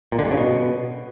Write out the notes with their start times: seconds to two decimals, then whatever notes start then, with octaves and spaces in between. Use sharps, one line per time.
0.12 A#2
0.19 D3
0.25 G2
0.31 C#3
0.37 B2